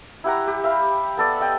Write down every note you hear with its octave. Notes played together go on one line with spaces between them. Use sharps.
E4 G4 F#5 A#5
G4
E5 F5 B5
B3 A4 D5
D#5 G5